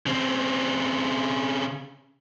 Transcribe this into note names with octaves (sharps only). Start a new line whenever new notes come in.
C#3 C4